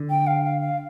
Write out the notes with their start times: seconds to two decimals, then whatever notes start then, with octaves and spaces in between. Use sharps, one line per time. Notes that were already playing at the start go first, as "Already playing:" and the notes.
Already playing: D3
0.10 G5
0.27 F5
0.45 F5
0.61 F5